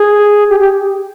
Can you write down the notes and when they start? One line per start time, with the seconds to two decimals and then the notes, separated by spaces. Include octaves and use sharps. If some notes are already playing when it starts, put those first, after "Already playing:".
Already playing: G#4
0.49 G4
0.60 G4